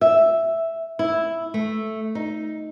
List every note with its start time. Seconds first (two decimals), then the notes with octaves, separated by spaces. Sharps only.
0.01 E5
0.99 E4
1.54 A3
2.15 D#4